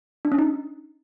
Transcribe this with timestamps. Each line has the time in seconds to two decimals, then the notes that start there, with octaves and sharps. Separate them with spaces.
0.25 D4
0.32 C#4
0.39 D#4